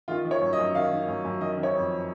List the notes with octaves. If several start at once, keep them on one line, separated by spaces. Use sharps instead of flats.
D#3 F4
D#3
C#5
F#2
D#5
F#2
D#3 F5
D#3
F#2
F#2
D#3 D#5
D#3
C#5
F2